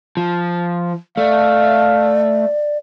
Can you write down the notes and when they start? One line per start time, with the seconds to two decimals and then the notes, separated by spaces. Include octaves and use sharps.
0.17 F3
1.17 A3 D5 F5